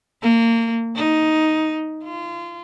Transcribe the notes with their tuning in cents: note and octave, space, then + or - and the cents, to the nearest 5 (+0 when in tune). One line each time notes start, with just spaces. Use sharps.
A#3 -25
D#4 +5
F4 -30